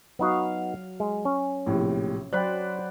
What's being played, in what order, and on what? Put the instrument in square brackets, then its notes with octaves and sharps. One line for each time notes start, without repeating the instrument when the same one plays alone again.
[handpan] F#3 F5 [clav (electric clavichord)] B3 D#4 F#4
[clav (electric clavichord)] G#3
C#4
[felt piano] A#1 A2 C3
[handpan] F#3 C5 D5 [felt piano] G5 B5 F#6